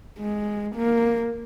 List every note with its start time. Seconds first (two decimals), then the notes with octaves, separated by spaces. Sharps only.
0.19 G#3
0.75 A#3